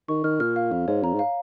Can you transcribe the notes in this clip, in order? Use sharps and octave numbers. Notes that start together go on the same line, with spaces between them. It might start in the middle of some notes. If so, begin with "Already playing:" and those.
D#3 C#6
D#3 F6
A#2 F6
F5
F2 F5
G#2 C#5
F2 A#5
G#2
F5